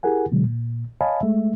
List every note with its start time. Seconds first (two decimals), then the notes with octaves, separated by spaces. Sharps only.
0.03 E4 G4 G#4 A#4 F#5 G#5
0.32 B2 D3 F#3 G#3
0.44 A#2
1.01 C#5 D#5 F5 G#5 A5 B5
1.21 G#3 A3 E5